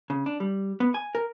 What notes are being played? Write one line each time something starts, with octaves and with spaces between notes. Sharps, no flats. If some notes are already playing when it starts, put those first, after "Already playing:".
C#3
D4
G3
B3
G#5
A#4